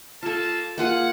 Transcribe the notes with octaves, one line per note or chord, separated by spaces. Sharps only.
A#3 F4 A4 A5
A#3 F4 G#4 F#5